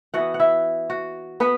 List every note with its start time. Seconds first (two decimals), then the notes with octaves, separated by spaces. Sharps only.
0.14 E3 B3 F#4 F#5
0.34 F#5
0.39 E4 E5
0.90 F#4
1.40 B3 B4